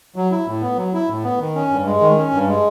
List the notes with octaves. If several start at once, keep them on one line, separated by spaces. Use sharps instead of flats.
F#3
E4
A2
B3
F#3
E4
A2
B3
D#3
C#4
G2
G#3
D#3
C#4
G2
G#3